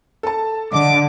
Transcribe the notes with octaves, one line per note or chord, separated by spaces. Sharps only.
A4 A5
D3 D#5 D6